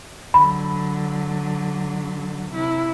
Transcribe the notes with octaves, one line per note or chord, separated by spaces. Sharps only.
D3 F#3 B5
C3 E4